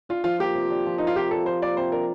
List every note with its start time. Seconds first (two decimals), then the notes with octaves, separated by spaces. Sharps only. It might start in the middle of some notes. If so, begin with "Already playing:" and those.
0.09 D4 F4
0.24 F3 F4
0.39 A#3 G4
0.55 C3
0.70 D4
0.86 F3
0.98 A#3 D#4
1.07 F4
1.16 C3 G4
1.31 D4 A4
1.46 F3 C5
1.62 A#3 D5
1.77 C3 C5
1.92 D4 A#4